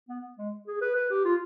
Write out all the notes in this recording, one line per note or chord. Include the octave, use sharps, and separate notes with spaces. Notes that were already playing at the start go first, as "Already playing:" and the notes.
B3
G#3
G#4
B4
B4
G4
F4